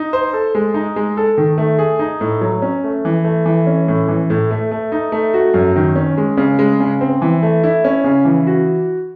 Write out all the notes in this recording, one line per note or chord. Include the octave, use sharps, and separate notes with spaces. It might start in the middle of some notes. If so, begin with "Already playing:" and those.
Already playing: D#4
C5
A4
G#3
D#4
G#3
A4
D#3
A3
G#4
D#4
A2
F#3
C#4
A3
E3
A3
E3
C#4
A2
E3
A2
A3
A3
D#4
A3
F#4
F#2
D#3
C#4
G#3
C#3
G#3
C#3
C4
E3
A3
E4
C#4
C#3
E3
F#4